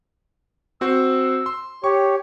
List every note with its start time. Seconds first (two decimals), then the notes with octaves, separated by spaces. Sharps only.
0.81 C4 F#4 C5 E6
1.46 C6
1.84 G4 C#5 C#6